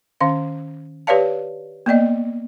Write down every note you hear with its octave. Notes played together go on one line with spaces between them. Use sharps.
D#3 C#4 F5
G4 B4 C#5 D5 F5 A5
A#3 B3 D5 D#5